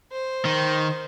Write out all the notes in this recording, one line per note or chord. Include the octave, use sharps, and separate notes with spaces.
C5
D#3